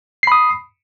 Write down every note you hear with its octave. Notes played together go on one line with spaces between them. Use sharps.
B5 D#6 C7